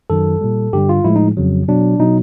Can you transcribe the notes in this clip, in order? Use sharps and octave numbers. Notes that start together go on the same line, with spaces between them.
F#2 D#3 F#3 A4
A#2 G3
G2 D3 G3 G4
F4
A2 F3 G#3 E4
D#4
F2 C#3 F#3
B2 F#3 D4
B2 F#3 D#4